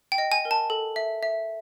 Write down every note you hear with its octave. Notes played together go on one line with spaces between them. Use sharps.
G5
D#5
G#5
A#4
A5
A4
E5
E5